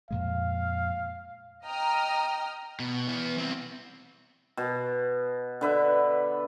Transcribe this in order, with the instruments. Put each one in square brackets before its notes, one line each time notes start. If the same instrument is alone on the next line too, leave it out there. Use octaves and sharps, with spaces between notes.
[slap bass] F2 A#2 G#3 [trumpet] F5
[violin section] D#5 G5 A#5 D#6 F6
[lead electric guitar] B2
B3 E4
C2 C4
[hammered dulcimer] B2
D3 B4 E5